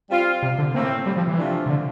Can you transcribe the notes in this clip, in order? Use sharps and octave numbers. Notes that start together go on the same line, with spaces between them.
G3 C4 F4
C3
D3
A2 E3 A3 A#3 C4
G3
F3
E3
C3 F3 A3 D4 F4
C3
D3